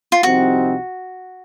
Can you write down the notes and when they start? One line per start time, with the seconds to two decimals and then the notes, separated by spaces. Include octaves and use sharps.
0.12 F4
0.23 C2 C3 F3 C4 D#4 F#4